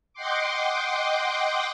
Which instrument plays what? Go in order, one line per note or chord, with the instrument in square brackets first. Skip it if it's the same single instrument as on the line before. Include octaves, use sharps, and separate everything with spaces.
[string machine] D#5 F#5 G5 C6 D6